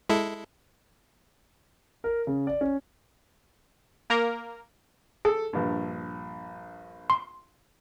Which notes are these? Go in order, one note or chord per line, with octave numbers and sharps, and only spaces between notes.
G#3 E4 A4
A#4
C#3
D5
C#4
A#3 A#4 A#5
G#4 A4
A#1 G2
C6